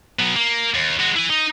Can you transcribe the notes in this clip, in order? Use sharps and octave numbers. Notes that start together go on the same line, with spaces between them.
F#3 B3
A#3
D#2
G#3 F#4
E4 G#5
D#4